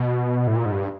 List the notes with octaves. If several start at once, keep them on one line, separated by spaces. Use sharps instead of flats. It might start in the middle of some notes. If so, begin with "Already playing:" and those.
Already playing: B2
A2
A#2
G#2
G2